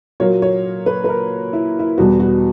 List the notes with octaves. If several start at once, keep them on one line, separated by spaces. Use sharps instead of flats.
A#2 F#3 A#3 C#5
C#5
B4
B4
A#4
E4
E4
E2 B2 G3 B3 F#4
F#4